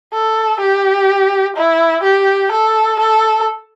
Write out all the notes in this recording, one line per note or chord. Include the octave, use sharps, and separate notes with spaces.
A4
G4
E4
G4
A4
A4